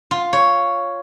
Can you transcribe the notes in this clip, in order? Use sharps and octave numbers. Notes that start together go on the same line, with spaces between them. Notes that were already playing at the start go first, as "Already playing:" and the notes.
F4
C#5